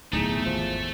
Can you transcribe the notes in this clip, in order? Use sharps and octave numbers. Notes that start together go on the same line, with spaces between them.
D1 B1 E2 A2 A3 D#4 G#4
G#1 F3